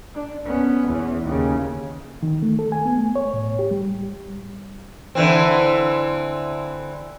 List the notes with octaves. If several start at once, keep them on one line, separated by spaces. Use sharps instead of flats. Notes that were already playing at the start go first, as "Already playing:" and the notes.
D4
B3 C#4
E2 E3
D#2 C#3
D#3
A3
A4
G#5
B3
A3
C#5
A2
G4
G3
D3 E3 C4